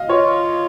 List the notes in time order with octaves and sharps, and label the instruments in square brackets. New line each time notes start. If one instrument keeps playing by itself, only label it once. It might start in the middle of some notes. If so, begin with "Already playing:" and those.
Already playing: [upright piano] D#5 F5
[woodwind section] F4 [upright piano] C#5